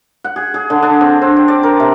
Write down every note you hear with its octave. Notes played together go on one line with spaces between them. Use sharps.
F#5
G#4
G#4
D3
D4
C4
C4
G5
D5
A#4
C3